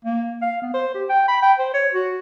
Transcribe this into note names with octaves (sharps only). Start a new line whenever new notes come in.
A#3
F5
B3
C5
G4
G5
B5
G5
C5
C#5
F#4